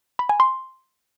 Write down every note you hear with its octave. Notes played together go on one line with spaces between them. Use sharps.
B5
G#5
C6